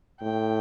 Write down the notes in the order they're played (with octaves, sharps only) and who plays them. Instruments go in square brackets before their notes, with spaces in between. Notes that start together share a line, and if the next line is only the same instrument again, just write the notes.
[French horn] A2 [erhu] G5